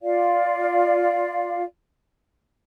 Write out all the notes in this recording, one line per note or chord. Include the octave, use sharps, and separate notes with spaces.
F4 D5 F5